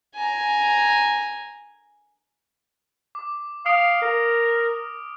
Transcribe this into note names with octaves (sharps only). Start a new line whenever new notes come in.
G#5 A#5
D6
F5 D#6 F6 D7
A#4